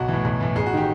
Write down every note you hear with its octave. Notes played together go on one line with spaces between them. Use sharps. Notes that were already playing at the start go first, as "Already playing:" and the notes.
Already playing: B1 F#4
A2 E3
B1
A2 E3
A1 G#4
F#4
D#3 G4